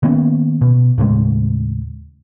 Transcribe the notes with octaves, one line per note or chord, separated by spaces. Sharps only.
D#3 A#3 B3 C#4
B2
D#2 A2 C#3 G#3